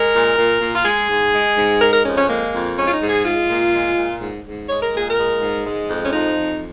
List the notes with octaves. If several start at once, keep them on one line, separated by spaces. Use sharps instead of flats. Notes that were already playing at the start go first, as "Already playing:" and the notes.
Already playing: G#3 A#4
A#2
A#2
A#2
F4
G#3 G#4
G#2
G#3
G#2
G#3 A#4
A#4
F2 C#4
C#4
G#3 A#3
F2
G#3 C#4
F4
D#4
G#2
G#4
G#3 F4
A#2
G#3
A#2
G#2
G#2
G#3 C#5
A#4
A#2 G#4
A#4
G#3
G#2
G#3
F2
C#4
F3 D#4
F2